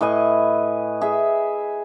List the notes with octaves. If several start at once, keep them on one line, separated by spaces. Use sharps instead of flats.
A2 B4 D#5 G#5
G#4 E5